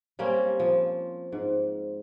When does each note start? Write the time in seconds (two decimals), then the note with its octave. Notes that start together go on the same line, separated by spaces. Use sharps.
0.19 G3 A#3 C4 C#4
0.60 F3
1.32 G#2